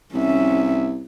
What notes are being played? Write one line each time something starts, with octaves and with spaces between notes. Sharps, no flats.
C2 C#4 E5